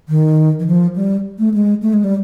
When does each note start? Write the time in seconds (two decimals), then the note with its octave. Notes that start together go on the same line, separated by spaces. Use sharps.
0.09 D#3
0.59 E3
0.67 F3
0.96 G3
1.39 A3
1.54 G#3
1.82 A3
1.93 G#3
2.04 G3